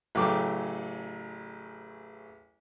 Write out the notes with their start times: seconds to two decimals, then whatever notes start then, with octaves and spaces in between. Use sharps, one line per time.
0.15 A1 C#3 F#3 A4 G5 D6